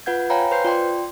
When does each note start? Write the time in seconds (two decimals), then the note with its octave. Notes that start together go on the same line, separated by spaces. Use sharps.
0.06 F4 B4 F#5 G6 G#6
0.30 C#5 F5 G5 G#5 A#5 B5
0.51 B4 C5 C6 G6 C7
0.65 F4 D5 G5 C6